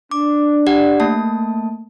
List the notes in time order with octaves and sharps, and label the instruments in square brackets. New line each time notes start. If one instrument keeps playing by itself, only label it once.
[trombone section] D4 [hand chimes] D6
[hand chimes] G4 D5 F#5
A3 A#3 A5